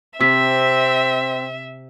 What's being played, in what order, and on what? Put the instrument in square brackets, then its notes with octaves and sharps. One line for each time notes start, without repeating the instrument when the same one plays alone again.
[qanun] C3 [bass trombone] C4 [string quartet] E5 [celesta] E6 B6